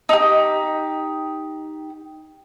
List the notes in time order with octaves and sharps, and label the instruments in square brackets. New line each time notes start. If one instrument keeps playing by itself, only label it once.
[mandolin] D#4 G4